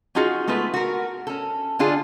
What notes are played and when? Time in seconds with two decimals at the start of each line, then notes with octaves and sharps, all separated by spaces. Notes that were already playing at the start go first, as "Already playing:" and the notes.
0.15 C#4 D#4 F4 F#4 G#4
0.48 G#3 A3 B3 F4 B4
0.74 F#4 A#4
1.27 C#4 A4
1.79 D3 D4 F4 G#4